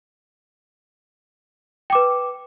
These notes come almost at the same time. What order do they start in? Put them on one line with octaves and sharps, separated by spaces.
G5 D6 B4